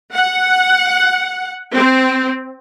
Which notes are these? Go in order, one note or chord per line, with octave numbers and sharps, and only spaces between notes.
F#5
C4